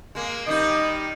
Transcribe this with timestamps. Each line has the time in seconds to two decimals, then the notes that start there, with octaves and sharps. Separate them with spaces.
0.15 G#3 A#3
0.47 D#3 G3 D#4 D#5